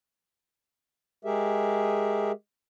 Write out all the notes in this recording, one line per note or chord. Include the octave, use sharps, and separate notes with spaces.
G#3 G4 G#4 A#4 E5